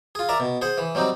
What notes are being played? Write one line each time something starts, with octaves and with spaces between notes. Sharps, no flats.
F4 G#4
A#4 D5 E5 A#5
B2
G#4 C5 F#5
E3
F#3 G3 C4 D#4